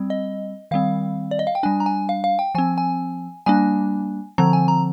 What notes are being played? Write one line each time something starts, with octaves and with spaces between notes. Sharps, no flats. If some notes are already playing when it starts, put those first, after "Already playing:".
Already playing: G3 C4
D#5
D#3 G3 C4 F5
D5
D#5
F5
G5
G3 D4 G#5
A#5
G#5
F5
F5
G5
F3 C4 G#5
G#5
G3 A#3 D4 G#5
D3 F3 C4 A#5
G#5
A#5